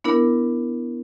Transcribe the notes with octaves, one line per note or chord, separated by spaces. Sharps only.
B3 D4 E4 A#4